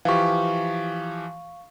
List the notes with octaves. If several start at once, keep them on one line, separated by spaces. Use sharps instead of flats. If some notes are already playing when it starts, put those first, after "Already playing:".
E3 F3 G4 F5 C#6